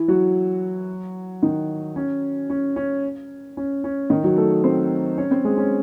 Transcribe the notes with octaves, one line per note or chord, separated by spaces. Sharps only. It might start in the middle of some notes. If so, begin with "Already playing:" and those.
Already playing: E3 E4
F#3 F#4
D#3 D#4
C#4
C#4
C#4
C#4
C#4
D#3 D#4
F#3 F#4
A3 A4
C4 C5
C#4 C#5
C4 C5
G#3 G#4
C#4